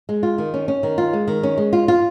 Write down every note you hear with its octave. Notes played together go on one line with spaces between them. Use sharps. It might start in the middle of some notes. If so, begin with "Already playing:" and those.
G#3
F4
D#3
C#4
C#4
D#3
F4
G#3
D#3
C#4
G#3
F4
F4